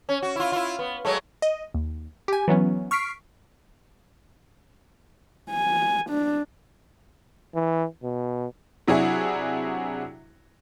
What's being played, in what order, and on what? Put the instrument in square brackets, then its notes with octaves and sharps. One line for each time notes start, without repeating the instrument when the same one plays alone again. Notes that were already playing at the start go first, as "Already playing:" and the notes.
[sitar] C#4
F#4
E4 F4
E4 F4
B3
F#3 G#3 A3
[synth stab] D#5
D#2
G4 G#5
E3 F#3 B3 C#4
C#6 F6 B6 C7 D7
[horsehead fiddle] G#5
D4
[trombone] E3
B2
[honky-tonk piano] C3 F#3 D4 E4 F#4 G#4